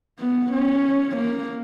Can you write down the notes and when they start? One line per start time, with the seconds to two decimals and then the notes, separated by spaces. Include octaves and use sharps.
0.19 B3
0.52 C#4
1.17 A#3